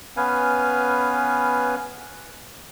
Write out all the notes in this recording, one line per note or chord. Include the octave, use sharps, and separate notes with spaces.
B3 C#4 B4 F5 G#5